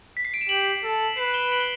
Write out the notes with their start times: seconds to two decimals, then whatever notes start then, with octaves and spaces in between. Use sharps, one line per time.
0.17 B6
0.25 C7
0.34 D7
0.41 E7
0.49 G4 D7 F#7
0.84 A4
1.17 B4 C7 E7
1.34 E7 G7
1.52 D7 F#7
1.60 G7